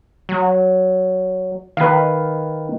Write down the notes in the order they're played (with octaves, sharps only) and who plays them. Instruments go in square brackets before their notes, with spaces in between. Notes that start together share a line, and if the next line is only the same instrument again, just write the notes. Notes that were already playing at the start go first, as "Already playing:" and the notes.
[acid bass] F#3
[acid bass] D#3 [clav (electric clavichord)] B4 F5